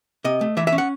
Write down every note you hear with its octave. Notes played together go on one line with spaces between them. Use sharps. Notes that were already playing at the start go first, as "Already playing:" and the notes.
C3 D#5
A3
E3 E5
E5
C#4
F#5